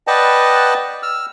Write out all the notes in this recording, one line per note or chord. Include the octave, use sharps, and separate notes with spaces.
B4 D5 D#5 F#5 G5 A5
E6 F6